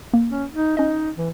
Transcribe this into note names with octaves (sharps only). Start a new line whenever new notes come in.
A#3
C#4
D#4
C#4 D#4 D#5
E3